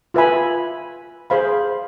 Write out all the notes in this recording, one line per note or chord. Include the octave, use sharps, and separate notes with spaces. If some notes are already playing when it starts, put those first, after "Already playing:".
F4 B4 E5 G#5 B5
G#4 C5 F5 B5